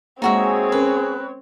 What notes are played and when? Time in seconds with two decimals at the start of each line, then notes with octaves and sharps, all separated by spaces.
0.22 G#3 A#3 C4 D#4 F#4 G#4 C#5 E5
0.72 C#4 A#4 B4